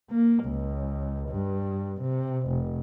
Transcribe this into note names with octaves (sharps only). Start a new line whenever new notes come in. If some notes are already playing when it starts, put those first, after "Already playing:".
A#3
C#2
G2
C3
F1